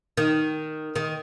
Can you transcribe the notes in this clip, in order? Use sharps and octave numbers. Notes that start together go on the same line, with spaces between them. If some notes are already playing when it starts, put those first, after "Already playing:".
D#3
D#3